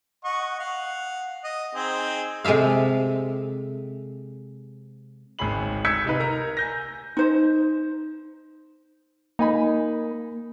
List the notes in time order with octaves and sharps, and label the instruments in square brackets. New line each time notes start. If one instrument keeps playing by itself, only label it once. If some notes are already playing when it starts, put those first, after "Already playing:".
[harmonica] D#5 F#5 C#6
F5 F#5
D#5
C4 D#4 G#4
[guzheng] C3 G#3 A4 E5 F5
[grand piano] G#1 C#2 C#4 G#4 B5 F#7
E6 G6 G#6 B6 C#7
C3 D#4 B4
A#4 A#5
G#5 G6 A#6
[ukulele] D#4 C5
[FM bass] A#3 [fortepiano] D#4 G#5 B5